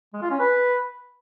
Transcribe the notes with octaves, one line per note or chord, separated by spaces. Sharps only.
G#3
F4
C#4
B4